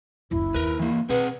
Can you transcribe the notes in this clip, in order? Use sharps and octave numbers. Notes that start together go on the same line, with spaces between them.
F#1 D2 E4
D#2 A#4 B4
E3 A#3
B2 C4 G#4 B4 F#5